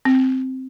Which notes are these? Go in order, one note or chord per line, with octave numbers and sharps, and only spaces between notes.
C4